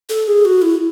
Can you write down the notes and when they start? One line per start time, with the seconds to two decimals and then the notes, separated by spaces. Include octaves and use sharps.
0.09 A4
0.28 G#4
0.45 F#4
0.62 E4